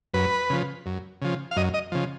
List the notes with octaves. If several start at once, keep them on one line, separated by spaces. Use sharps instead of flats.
F#2 B4
C#3 F3
F#2
C#3 F3
F5
F#2 D#5
D#5
C#3 F3